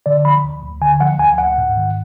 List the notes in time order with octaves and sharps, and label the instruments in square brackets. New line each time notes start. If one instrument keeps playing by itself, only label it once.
[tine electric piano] D3 D5
F3 B5
D2
D2
D3 G#5
F3 F#5
D2 G#5
D2 F#5
G#2
D#3